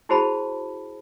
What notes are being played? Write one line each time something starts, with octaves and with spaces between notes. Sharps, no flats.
E4 F#4 G#4 C5 A5 B5